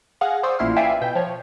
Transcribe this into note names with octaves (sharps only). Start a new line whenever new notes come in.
G#4 F5 F#5 A#6
C5 D5 C#6 D#6 E6
A1 A#2 E4 C6 F6
B4 D5 E5 F5 G5 G#5
B2 G5
F3 C#5